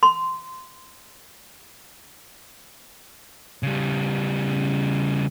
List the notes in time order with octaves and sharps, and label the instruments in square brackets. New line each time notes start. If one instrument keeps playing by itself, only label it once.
[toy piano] C6
[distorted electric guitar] C#3 G3